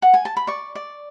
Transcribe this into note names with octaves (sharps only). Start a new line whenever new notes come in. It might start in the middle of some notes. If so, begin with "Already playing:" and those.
F#5
G#5
A5
B5
D5 C#6
D5